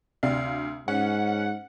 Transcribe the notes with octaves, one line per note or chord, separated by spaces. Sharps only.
D2 C3 C4 D5 F5
G#2 C#4 F#5